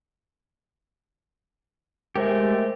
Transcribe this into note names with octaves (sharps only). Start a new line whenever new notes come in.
G#3 A3 G4 A#4 C5 E5